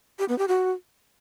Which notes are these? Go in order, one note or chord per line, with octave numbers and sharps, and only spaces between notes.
G4
B3
G4
F#4